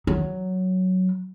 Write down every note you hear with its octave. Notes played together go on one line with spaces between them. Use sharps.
F#3